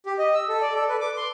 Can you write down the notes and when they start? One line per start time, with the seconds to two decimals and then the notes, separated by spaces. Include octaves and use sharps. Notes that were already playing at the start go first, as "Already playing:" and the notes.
0.06 G4
0.19 D#5
0.34 E6
0.48 A4
0.61 D5
0.75 A4
0.89 B4
1.01 D6
1.17 C6